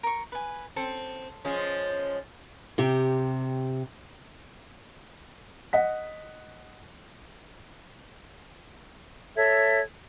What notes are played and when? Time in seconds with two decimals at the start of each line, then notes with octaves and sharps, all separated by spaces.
0.03 A#4 C#6
0.32 B4 G#5
0.76 C4 A4
1.45 F3 G#3 C#4
2.78 C3 G4
5.73 D#5 F#5 B6
9.36 A4 C#5 E5 G#6